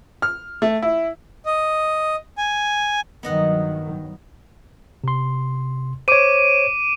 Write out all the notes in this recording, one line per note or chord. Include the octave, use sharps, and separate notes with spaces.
F6
A3
E4
D#5
G#5
G2 D#3 F#3 B3 D#5 F#5
C3 C6
C5 C#5 D6 D7 D#7